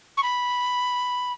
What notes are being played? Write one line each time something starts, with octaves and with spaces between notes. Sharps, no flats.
C#6
B5